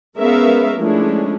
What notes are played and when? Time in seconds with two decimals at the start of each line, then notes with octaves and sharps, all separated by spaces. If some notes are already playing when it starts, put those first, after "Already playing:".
0.19 G#3 B3 C#4 A#4 E5 F5
0.80 F3 G#3 A3 C#4 D4 E4